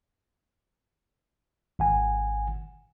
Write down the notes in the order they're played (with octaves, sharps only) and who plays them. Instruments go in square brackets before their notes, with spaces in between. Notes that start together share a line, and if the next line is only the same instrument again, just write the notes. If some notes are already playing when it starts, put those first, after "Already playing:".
[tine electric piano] G#1 F#5 G#5